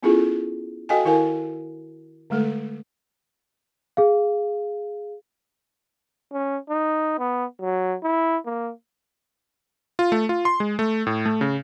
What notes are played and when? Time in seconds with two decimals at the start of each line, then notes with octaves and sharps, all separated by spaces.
0.03 B3 C#4 E4 F4 G#4 A4
0.89 F#4 A4 D#5 F5 G5 G#5
1.05 D#3 E4 A#4 F5 G#5
2.30 D3 G#3 A3 A4
3.97 G#4 F5
6.32 C#4
6.69 D#4
7.19 B3
7.61 F#3
8.03 E4
8.46 A#3
9.99 F4
10.12 A3
10.29 F4
10.45 C6
10.60 G#3
10.79 A3
11.07 A2
11.26 A3
11.41 C#3